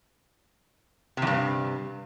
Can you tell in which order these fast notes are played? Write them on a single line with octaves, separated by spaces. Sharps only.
C3 E2 G2